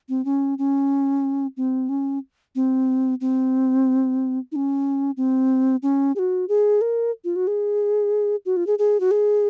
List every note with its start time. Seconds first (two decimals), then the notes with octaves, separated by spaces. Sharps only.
0.09 C4
0.25 C#4
0.58 C#4
1.57 C4
1.89 C#4
2.55 C4
3.21 C4
4.52 D#4
4.56 C#4
5.17 C4
5.83 C#4
6.16 G#4
6.19 F#4
6.49 G#4
6.81 A#4
7.25 F4
7.36 F#4
7.47 G#4
8.46 F#4
8.57 F4
8.67 G#4
8.79 G#4
9.00 F#4
9.11 G#4